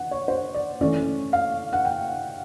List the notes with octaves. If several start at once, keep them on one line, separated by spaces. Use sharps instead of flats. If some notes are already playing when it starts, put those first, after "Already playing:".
Already playing: F#5
C#5
C5
D5
E3 A3 C#4 D5
F5
F#5
G5